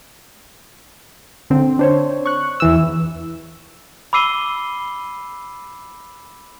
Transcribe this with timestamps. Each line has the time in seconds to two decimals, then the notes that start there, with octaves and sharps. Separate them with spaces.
1.50 D3 C4
1.79 D4 C5 C#5
2.26 C#6 F#6
2.60 E2 E3 E6
4.13 B5 D6 E6 C7 D#7 G7